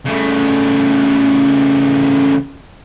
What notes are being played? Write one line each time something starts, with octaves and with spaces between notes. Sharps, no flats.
C#3 A3